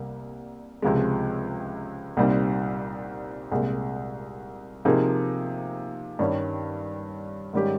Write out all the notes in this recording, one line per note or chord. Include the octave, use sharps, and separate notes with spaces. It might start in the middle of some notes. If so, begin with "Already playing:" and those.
Already playing: C2 C3 G3 A#3
C#2 C3 F3 G#3
C2 A#2 G3 C4 D#4
C2 A#2 G#3
C3 F3 A#3 D#4 G#4
G2 D#3 G3 C#4
G#2 D#3 G3 C#4 G4